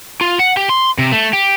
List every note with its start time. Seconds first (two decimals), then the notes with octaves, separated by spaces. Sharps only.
0.21 F4
0.39 F#5
0.57 G4
0.69 C6
0.99 C3
1.12 A3
1.33 G4